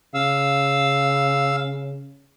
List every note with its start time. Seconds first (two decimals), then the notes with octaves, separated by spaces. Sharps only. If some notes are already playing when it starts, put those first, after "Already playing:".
0.15 C#3 F5 E6